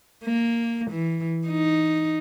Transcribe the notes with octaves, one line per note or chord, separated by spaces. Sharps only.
A#3
E3
D#4